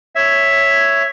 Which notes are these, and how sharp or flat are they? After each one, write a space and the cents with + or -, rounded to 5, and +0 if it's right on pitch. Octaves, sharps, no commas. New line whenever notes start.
C#5 +0 E5 +0